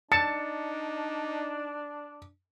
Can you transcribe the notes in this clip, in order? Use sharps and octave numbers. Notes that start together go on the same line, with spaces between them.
D4 D#4 A5 C#7